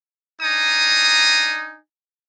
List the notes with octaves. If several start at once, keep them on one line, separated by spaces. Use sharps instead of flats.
D4 D#4 G#5 A#5 D#6